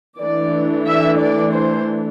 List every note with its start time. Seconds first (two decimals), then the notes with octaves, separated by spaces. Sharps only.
0.19 E3 A3 D4 D5
0.87 E5
1.20 D5
1.54 C5